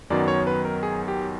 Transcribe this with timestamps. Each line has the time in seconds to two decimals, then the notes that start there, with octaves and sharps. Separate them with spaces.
0.10 F#2 D#3 F#3 B3 D5
0.28 C#5
0.47 B4
0.65 A#4
0.83 G#4
1.08 G4